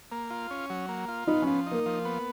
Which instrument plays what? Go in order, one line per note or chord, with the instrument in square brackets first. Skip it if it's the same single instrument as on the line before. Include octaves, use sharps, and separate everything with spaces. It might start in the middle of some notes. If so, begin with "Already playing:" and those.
[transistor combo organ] A#3
F4
C#4
F#3
A#3
F4
[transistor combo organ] B3 [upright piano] D#4
[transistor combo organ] F3 [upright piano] C#4
[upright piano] A#3 [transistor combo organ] D#4
[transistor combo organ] F3
B3